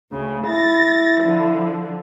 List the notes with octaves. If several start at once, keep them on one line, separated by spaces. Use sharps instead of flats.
D2 C#3
E4 A6 A#6
D3 F3